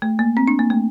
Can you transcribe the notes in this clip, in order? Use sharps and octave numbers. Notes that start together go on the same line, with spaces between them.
A3
A#3
C4
D4
A#3
A3